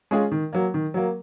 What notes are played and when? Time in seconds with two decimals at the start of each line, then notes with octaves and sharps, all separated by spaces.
0.11 G#3 C#4 F4 G#4
0.32 D#3
0.53 F#3 A#3
0.74 D#3
0.94 F#3 A#3